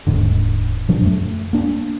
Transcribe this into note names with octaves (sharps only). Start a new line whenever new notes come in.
D#1 D#2 G#2 D3
A#2 F3 F#3 D4
F#2 A3
A#3 D4